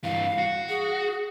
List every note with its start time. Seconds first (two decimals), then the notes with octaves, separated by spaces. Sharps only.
0.04 G2 E3 F5
0.38 F#4
0.69 G#4